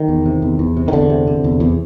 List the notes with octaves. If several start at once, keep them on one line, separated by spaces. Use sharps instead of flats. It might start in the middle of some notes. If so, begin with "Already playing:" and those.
Already playing: D#3
E2
C3
E2
E2
C3
D#3
E2 D3
C3
C3
E2
E2